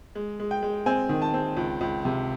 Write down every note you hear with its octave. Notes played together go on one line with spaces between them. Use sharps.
G#3
G#3
G5
G#3
C4 G#5
D#3
A5
C4
C#2
C#2
C3